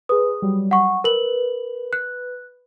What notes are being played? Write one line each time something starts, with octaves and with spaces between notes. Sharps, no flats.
G#4 B4 D#6
F#3 G3
F#5 C#6
A#4 B4 F#7
F#6